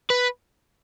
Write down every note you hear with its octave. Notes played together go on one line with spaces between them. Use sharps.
B4